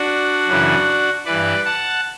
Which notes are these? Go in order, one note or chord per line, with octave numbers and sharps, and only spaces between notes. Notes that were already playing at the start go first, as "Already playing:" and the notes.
Already playing: D4 F#4
F#2 C#3 E3
G2 E3 B4 D5
F#5 A5